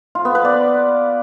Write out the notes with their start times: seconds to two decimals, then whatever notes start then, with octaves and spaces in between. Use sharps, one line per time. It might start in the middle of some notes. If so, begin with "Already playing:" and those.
0.15 F4
0.25 B3
0.35 B4
0.45 D5